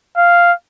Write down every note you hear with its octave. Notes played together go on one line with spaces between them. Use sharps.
F5